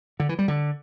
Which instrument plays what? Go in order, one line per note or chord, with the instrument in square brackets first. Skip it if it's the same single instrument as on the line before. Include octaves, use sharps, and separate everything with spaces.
[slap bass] D3
E3
G3
D3